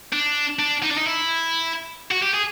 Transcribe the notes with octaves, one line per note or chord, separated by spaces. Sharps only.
D4
D4
D#4
D4
D#4
E4
F#4
G4
G#4